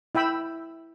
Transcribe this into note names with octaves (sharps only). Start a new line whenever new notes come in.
E4 E5 G5 B5 E6